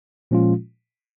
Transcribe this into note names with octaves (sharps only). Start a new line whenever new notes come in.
A#2 F3 G#3 C#4 F4